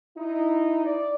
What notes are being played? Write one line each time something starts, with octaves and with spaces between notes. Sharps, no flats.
D#4 E4
D5